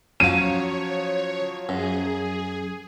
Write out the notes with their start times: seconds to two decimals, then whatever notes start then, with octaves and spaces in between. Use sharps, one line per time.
0.20 F3 F#3 C#4 C#5 F5 D#7
1.69 F#2 G#4